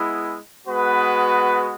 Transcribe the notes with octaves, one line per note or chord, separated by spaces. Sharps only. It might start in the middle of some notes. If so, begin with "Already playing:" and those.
Already playing: G#3 B3 E4
G#3 B3 F#4 B4